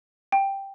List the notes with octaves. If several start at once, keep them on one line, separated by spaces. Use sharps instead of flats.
G5